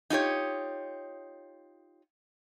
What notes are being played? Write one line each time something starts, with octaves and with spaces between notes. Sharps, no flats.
D#4 F4 G4 C#5